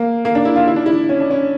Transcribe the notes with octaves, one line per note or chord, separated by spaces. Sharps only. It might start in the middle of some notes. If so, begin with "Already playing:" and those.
Already playing: A#3
A#3
D4
E4
F4
E4
D4
E4
C#4
D4
C#4